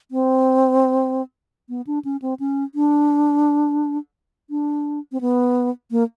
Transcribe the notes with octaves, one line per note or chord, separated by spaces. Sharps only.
C4
B3
D4
C#4
C4
C#4
D4
D4
C4
B3
A#3